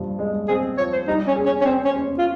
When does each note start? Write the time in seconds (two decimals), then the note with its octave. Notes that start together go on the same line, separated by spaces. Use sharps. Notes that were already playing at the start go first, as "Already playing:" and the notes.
Already playing: G2 F3
0.19 G#3
0.48 C4 G#4
0.78 F3 C#5
0.92 C5
1.07 G3 D#4
1.27 C#4
1.36 G#4
1.46 C#4
1.61 C#4
1.65 C4 C5
1.85 C#4
1.95 C#4
2.18 F4